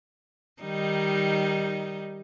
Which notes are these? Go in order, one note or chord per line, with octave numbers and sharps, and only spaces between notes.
D#3 G3 D#4